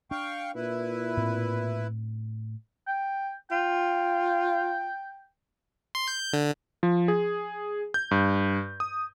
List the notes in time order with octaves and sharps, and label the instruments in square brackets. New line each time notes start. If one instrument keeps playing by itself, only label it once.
[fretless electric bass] D4 [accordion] F5 G5 C#6
[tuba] A#2 [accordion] E4 B4
[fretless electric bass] A2 C4
[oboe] G5
[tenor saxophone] F4 [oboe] G5
[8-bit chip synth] C6
G6
D3
[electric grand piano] F3
G#4
G6
G2
D#6